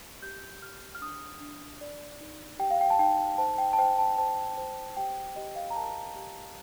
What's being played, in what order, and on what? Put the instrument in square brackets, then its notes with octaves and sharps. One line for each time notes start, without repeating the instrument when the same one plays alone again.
[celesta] G4 G6
G4 F6
F6
D4 D#6
D4
D5
D#4
G4 G5
F5
G5
A5
D#4 G5
C5 A5
G5
A5
C5 G5
A5
C5 A5
C5
G4 G5
G4 D#5
F5
A#5
A#4 A5
G4